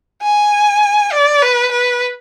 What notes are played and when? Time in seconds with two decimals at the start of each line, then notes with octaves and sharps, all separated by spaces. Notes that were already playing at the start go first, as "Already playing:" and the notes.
0.23 G#5
1.12 D5
1.42 B4
1.72 B4